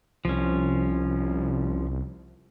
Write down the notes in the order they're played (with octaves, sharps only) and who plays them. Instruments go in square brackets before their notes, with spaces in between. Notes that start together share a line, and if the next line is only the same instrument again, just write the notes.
[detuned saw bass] C2 [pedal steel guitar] F3 C#4